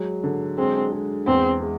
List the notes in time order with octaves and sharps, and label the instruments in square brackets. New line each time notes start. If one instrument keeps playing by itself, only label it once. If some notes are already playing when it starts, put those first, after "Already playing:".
Already playing: [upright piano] F#3 G#3
D3
[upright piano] G#3 [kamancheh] C4
[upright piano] G#3
[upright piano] E2 [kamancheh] C4
[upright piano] G#3